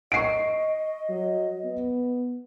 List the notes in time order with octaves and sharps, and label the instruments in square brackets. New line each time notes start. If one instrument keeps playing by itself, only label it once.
[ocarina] D#5 [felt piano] C#6 C7 D7
[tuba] F#3
B3